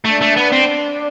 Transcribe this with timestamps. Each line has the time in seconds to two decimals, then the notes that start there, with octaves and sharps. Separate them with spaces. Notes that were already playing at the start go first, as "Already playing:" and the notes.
0.06 A3 D4
0.22 A3
0.37 B3
0.53 C4